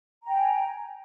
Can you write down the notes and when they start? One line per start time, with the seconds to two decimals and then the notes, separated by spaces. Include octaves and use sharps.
0.23 A#5
0.27 G5
0.32 G#5